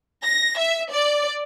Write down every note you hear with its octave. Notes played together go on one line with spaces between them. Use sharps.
A#6
E5
D5